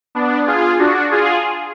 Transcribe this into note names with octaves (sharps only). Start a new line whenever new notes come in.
B3 D4
F4 G#4
D4 F#4
F4 G#4